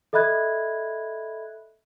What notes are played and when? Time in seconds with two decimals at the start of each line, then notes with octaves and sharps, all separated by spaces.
0.13 A4 D#5 E5 B5 F#6 G#6